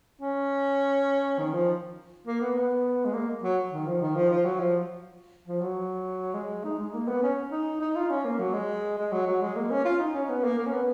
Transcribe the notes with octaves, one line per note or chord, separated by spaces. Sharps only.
C#4
D#3
F3
A#3
B3
B3
G#3
A#3
F#3
D#3
F3
D#3
F3
F3
F#3
F3
F3
F#3
G#3
D#4
G#3
A#3
B3
C#4
D#4
D#4
F4
C#4
A#3
F#3
G#3
G#3
F#3
F#3
G#3
A#3
C#4
F4
D#4
C#4
B3
A#3
A#3
C#4
B3